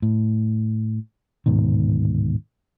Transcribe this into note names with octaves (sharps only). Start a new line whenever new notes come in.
A2
D1 G#2 B2 D#3